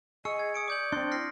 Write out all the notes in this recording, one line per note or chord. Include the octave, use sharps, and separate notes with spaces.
G#4 D#5 C#6 E6 C#7
G#6
D#6 C#7 D7
D5 D6 G6 F#7
C4 D4 C6
E4 F6 A#6 C7